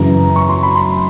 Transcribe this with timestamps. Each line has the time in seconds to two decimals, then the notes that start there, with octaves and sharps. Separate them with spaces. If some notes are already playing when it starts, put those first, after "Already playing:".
Already playing: F#2 C#3 E3 A#5
0.36 C#6
0.49 C6
0.63 B5
0.76 C6